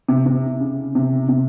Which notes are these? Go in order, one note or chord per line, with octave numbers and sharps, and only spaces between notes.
C3
C3
C#3
C3
C3